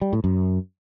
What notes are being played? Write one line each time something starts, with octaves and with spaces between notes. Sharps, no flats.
G3
A2
F#2